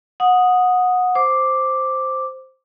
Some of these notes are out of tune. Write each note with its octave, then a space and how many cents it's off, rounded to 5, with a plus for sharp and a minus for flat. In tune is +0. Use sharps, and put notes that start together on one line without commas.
F#5 -20 D#6 +0
C5 +0 D6 +0